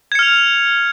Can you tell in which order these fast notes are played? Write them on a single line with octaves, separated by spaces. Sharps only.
G#6 C#7 F6 F7